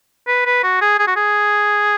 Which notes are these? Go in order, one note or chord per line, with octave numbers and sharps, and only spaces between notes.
B4
B4
F#4
G#4
G#4
F#4
G#4